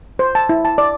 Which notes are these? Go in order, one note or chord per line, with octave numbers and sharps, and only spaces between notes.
C5
A5
E4
A5
D5